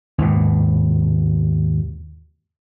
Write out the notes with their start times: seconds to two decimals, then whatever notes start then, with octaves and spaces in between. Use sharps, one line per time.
0.18 D#2 G#2 B2